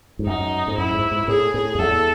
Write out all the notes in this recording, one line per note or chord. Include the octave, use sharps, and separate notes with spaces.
G#2
F#2 D#4
G#2
F#2 E4
G#2
G#2
A2 G#4
A2
F#2
E2 A4